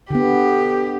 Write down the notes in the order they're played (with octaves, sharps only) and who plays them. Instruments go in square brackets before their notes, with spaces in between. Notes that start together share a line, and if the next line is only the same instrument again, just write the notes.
[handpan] D3 B3 [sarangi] G4